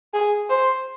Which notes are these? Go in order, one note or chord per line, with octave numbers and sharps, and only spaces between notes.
G#4
C5